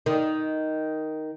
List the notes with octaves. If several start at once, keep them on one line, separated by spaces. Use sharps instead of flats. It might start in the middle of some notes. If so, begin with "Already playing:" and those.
D#3